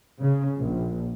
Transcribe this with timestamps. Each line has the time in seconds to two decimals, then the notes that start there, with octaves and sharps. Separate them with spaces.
0.21 C#3
0.59 A#1